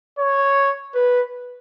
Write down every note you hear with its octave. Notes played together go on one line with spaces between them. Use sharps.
C#5
B4